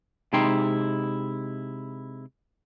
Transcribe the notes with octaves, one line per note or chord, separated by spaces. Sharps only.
C3 G#3 D#4 E4 G5 C6